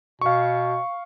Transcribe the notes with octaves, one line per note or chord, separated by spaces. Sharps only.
B2 F5 C#6